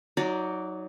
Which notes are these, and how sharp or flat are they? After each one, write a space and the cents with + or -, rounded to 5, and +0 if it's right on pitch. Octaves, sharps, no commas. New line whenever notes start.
F#3 +0 D#4 +25 D5 -15